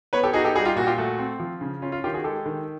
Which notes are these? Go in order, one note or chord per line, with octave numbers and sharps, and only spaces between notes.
B3 B4 C#5
G4 A4
D#4 F#4 G#4
G4 A4
G3 F#4 G#4
F4 G4
A#2 F#4
F4 G4
A3 F#4
C4
F3
C#3
C#4 F4
F4
D#3 F4 G4
F#4 G#4
G#3 G4 A4
D#3